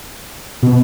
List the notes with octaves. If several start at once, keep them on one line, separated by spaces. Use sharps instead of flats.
B2